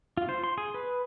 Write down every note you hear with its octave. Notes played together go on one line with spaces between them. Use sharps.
F4
C5
C6
G#4
B4